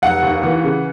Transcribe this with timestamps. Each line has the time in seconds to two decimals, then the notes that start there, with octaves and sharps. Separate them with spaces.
0.02 F1 F#5
0.23 D#2
0.43 E3
0.64 C#3